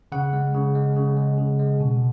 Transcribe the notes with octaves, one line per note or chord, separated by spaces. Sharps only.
C#3 F#5
G#3
C#3
G#3
C#3
G#3
C#3
G#3
B2